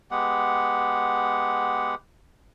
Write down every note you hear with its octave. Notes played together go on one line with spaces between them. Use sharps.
G#3 B3 G4 F#5